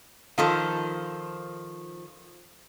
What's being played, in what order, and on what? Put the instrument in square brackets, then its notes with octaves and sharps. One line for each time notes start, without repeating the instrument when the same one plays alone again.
[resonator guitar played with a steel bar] D#3 F3 [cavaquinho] F4 A4 C5